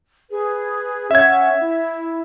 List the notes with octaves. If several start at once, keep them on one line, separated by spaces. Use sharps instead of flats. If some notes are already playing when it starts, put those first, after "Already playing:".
G#4 B4
C#4 C#5 E5 F#5 G#6
E4